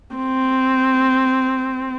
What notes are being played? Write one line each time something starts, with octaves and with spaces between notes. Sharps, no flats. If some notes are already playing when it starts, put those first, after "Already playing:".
C4